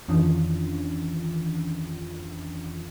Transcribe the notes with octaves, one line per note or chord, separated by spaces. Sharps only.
F2 D#3 E3 C#4 D4 F4